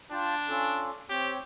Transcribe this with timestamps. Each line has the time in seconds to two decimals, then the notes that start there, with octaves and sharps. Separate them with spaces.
0.12 D4 F4 G5 A5
0.49 C#4 F4 A4
1.10 C4 G4 C#5 G5